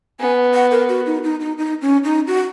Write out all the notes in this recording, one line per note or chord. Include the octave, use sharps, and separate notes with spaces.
B3 G#5
F#5
A#4
F#4
D#4
D#4
D#4
D#4
C#4
D#4
F#4